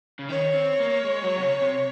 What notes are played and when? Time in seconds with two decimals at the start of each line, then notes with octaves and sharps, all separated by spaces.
0.19 C#3
0.29 D#3 C#5
0.54 C4
0.80 A#3
1.05 G#3
1.24 F#3
1.37 C3
1.43 C#3
1.62 C3